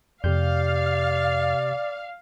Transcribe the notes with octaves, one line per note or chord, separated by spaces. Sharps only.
F2 C3 G4 D5 F5 G6